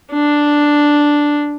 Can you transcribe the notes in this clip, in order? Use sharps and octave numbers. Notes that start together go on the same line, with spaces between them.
D4